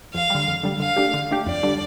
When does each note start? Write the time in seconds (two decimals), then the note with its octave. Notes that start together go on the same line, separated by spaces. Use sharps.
0.14 F2 F5
0.30 D3 G3
0.48 F2
0.63 D3 G3
0.80 D3 F5
0.96 A3 D4 G4
1.14 D3
1.31 A3 D4 G4
1.46 F2 D5
1.63 D3 G3 D4